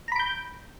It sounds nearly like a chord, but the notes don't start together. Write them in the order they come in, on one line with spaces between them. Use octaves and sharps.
A#5 B5 D7 G6